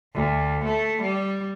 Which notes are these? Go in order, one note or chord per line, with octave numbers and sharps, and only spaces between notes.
D2
A3
G3